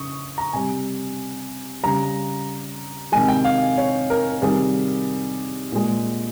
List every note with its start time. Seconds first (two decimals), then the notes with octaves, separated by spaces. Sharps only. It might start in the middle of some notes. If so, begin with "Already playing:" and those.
Already playing: C#3 C#6 D#6
0.38 A#5
0.53 C3 G3 G#5
1.83 C#3 G3 A#5
3.12 C3 D#3 G#3 G#5
3.28 G5
3.45 F5
3.78 C#5
4.10 A#4
4.42 C3 D#3 G3 G#4
5.72 A#2 G#3